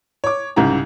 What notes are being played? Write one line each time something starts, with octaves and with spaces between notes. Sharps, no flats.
C#5 D6
C2 G#2 C#3 G4 A#5